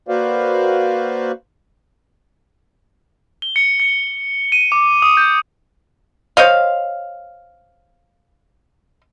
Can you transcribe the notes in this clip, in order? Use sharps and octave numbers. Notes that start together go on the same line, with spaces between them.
A#3 F#4 B4 C5 D5 F5
G7
C#7
C#7
D#7
D6
D#6
G6
C5 C#5 D#5 F5